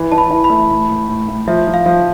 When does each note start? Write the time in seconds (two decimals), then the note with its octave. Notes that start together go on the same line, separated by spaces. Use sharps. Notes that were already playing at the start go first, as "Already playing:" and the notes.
Already playing: E3
0.12 E3 A5
0.18 B5
0.30 E3
0.44 B5
0.50 A3
0.70 A2
0.89 A2
1.09 A2
1.28 A2
1.48 F3 E5
1.67 F3
1.74 F5
1.86 F3